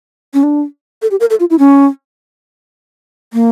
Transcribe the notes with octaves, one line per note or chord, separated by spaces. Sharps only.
C#4
D4
A4
G4
A#4
A4
F4
E4
C#4
A#3